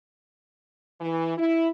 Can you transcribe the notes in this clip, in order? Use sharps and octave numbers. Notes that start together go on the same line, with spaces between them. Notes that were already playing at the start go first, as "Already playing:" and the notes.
E3
E4